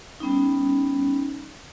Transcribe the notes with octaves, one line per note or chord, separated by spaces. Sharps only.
G3 B3 C#4 D#4